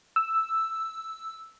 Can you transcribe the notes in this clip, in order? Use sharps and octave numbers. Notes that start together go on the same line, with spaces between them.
E6